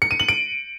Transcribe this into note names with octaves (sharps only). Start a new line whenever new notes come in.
C#7
D#7
F#7
D7